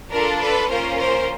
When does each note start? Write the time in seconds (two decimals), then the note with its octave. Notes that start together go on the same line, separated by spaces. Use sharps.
0.11 D4 F4 A4 A#4
0.40 A4 B4
0.69 A#3 C#4 F4 A#4 C5
0.98 A#4 C5